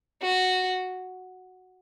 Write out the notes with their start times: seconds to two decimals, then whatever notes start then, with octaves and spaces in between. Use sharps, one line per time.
0.21 F#4